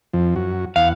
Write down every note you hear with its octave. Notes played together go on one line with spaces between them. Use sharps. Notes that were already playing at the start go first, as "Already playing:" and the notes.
F2 F3
F#2 F#4
E2 F5 F#5